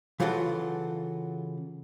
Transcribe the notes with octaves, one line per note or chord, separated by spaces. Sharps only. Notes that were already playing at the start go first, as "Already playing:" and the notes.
C#3 E3 F#3 F4 F#4 A4